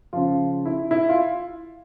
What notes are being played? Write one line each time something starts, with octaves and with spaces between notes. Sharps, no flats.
C#3 F3 F4
E4
E4
F4